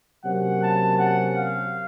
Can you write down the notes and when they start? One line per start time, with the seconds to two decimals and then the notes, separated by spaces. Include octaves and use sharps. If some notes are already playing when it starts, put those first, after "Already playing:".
0.23 C3 F#3 A#3 C#4 F#5
0.61 A5
0.98 F#5
1.36 F5